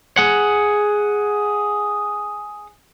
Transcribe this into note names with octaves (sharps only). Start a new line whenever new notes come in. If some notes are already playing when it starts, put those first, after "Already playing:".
G#4 F#5